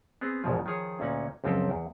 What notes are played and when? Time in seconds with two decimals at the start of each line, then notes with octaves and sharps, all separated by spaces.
0.21 B3 C4 G#4
0.44 A#1 E2 G#2 B2 F3
0.66 D#3 F3 G#4 C#5
1.00 D2 A#2 C#4 D#4 F#5
1.44 C#2 F#2 F3 C4 G4 A4
1.70 E2